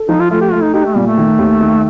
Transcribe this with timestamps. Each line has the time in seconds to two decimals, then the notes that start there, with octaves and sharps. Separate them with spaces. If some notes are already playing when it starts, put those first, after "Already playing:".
Already playing: A4
0.09 F3 D#4
0.20 F4
0.31 A3 F4
0.41 G4
0.52 A3 F4
0.63 D#4
0.74 D#4 G4
0.85 A3
0.96 A#2 G3
1.06 A3
1.18 D#3
1.39 D#2
1.61 D#3